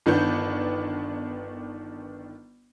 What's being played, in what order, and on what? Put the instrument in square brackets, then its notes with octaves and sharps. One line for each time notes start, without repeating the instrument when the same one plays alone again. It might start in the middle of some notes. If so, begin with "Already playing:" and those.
[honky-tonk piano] G1 D#3 B3 D4 G6